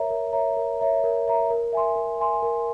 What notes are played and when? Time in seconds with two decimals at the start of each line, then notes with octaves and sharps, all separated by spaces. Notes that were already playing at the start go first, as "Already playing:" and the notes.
Already playing: A#4 C#5 E5 A#5
0.10 A#4
0.33 C#5 E5 A#5
0.57 A#4
0.80 C#5 E5 A#5
1.04 A#4
1.27 C#5 E5 A#5
1.50 A#4
1.73 E5 G#5 C6
1.96 A#4
2.20 E5 G#5 C6
2.43 A#4